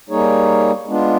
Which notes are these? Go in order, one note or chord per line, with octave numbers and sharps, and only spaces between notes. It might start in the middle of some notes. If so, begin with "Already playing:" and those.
G3 A#3 D#4 G#4 C#5
G#3 B3 D4 F4